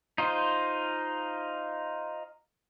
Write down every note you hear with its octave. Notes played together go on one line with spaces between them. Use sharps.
D#4 F4 C5